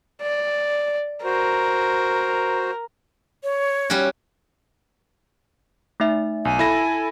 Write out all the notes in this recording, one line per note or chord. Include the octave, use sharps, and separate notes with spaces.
D5
F#4 A#4 C5
C#5
G3 C#4 F#4
A3 D#4 E5
B1 G#5
E4 A4 B5 A#6